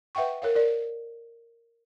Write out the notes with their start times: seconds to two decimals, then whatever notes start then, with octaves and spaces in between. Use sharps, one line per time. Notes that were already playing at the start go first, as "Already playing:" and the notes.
0.15 B4 E5 F#5 G5 C#6
0.42 A#4 C#5 F5
0.55 A#4 D5